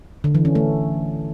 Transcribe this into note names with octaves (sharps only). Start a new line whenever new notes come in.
D3
E3
C#4
A3